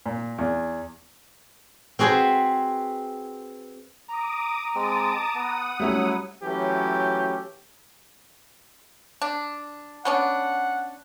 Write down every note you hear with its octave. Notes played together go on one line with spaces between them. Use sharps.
A#2
E2
C4 F#4 G#4 B4 C5
A#5 D6 D#6
G#3 C4 A5 D6 D#6
B3 F#5 D#6
F#3 G3 A3 C#4 E4
E3 F#3 A3 C#4 G4
D4
B3 C#4 D4 F#5